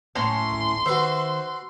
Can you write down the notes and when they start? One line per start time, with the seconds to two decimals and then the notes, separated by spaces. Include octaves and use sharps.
0.15 F#1 A2 C#4 A#5 C6
0.50 D1 G#1
0.86 D#3 F#4 B4 C5 E5